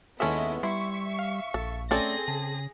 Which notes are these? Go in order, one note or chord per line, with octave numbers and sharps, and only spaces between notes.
D#2 G#3 B3 C#4 E4 A4 D#5 E5
G3 E4 E5 C6 C#6
F5
A#1 A4
A3 C4 C#4 G#4 A4 D5 A#6
C#3 A5